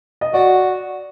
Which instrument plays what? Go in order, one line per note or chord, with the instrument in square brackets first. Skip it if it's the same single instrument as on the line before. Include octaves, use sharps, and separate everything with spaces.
[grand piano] D#5
[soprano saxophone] F#4 [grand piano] D5